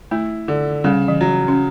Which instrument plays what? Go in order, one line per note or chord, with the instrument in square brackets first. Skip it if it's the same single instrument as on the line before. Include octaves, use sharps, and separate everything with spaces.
[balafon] A3 [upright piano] E4
[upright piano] D3
[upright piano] C#3 [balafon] G3
[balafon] E3
[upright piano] F#3
[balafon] C#4